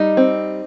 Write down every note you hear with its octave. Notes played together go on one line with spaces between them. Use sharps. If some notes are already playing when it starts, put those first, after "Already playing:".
Already playing: G3 D#4
C4